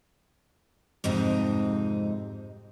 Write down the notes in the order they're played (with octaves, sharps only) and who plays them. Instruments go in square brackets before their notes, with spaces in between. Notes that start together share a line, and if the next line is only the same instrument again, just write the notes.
[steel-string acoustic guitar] F2 G#2 C3 D#4